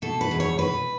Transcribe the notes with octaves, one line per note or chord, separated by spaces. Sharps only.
B2 A4
B4
E2
C#5
B2 B4